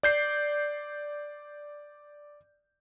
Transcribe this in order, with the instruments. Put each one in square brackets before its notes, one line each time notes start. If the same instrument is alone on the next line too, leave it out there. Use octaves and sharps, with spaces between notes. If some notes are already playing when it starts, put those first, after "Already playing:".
[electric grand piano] D5 G6 C7